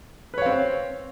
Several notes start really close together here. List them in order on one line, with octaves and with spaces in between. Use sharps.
B4 C#5 F5 C4